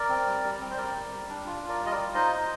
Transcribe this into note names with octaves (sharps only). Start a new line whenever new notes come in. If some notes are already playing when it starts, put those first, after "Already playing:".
Already playing: A#4 D5
C4
G3
G3
C4
C5
G3 A#4 D5
G3
G3
D4
F4
F4
A#4 D5
G3
D#5
A#4 D5
F4
D#4 C5 D#5
D#4